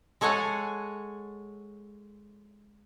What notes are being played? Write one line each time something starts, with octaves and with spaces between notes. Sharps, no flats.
G#3 A4 C#5 F#5 G#5